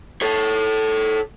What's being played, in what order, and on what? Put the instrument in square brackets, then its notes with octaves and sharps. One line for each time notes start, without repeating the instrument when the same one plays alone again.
[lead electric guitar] A4 C#5